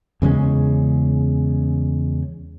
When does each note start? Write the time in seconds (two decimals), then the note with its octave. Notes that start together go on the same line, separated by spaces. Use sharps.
0.22 E2 C#3 G#3 C#4